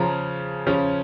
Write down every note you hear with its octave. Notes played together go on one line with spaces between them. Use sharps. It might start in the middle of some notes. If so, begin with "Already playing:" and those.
Already playing: C#3 F3 C#4 A#5
C#3 F3 C#4